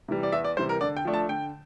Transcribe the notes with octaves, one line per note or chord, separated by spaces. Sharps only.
C3 E3 G3
D5
E2 E5
D5
C3 E3 G3 C5
A#4
D3 D5
G5
F3 A3 D4
A5
D3 G5